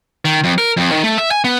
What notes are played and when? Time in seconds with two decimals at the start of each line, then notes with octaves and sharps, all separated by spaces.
0.25 D#3
0.44 F2
0.58 A#4
0.77 F2
0.92 D#3
1.04 A3
1.18 E5
1.31 G#5
1.44 B3